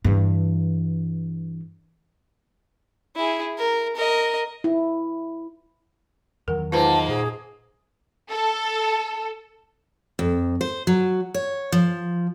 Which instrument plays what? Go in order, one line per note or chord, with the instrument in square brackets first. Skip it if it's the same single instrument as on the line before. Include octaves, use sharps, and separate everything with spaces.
[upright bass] G2 E3
[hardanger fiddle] E4 G#4
A#4
A#4 D#5
[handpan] E4
[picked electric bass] E2 D#3 F#3 [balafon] A#4 F#5
[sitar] G#2 A#3 [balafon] F4 B4 C5 [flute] A5
[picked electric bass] A#2 [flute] G#4
[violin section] A4
[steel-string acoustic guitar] F2
C5
F#3
C#5
F3